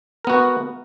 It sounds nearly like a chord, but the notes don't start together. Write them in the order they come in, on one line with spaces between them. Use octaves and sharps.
A#4 B3 F#4